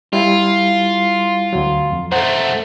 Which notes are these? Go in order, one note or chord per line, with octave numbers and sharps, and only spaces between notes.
G3 E4 F4
D2 F#3
F2
F#2 A3 C5 F#5